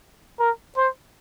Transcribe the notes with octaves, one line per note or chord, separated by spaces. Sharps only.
A#4
C5